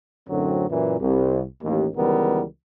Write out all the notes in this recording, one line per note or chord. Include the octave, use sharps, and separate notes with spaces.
F#2 A2 D3 F#3 C4
F#2 A#2 E3
C2
A1 D#2
C#2 D#3 E3 G3 B3 A#4